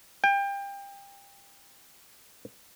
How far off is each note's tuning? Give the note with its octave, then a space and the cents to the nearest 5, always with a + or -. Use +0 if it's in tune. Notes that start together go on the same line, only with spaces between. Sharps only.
G5 +25